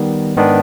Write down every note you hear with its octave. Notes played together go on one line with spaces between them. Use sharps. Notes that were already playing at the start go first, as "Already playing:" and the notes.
Already playing: D#3 G3 B3
G#2 D#3 B3 D4